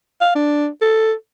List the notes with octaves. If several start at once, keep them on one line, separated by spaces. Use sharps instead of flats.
F5
D4
A4